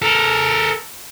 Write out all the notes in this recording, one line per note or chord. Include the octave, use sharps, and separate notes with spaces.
A4 A#4